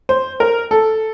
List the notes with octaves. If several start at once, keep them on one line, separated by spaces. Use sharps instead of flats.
C5
A#4
A4